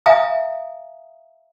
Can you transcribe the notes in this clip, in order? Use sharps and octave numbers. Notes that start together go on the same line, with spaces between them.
E5 F5 G#5 A#5 D#6